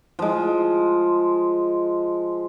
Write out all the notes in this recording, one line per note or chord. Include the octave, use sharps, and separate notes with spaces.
F3 G#3